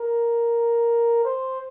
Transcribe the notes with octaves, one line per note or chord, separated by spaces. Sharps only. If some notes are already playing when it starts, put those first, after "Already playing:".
Already playing: A#4
C5